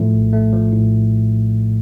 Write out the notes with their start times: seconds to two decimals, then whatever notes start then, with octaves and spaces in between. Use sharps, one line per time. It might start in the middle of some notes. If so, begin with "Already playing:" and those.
Already playing: A2 F3 A3
0.13 A#1
0.33 A3
0.53 F3
0.73 A2